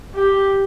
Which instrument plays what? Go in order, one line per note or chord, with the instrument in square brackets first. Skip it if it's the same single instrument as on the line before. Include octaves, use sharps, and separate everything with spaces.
[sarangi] G4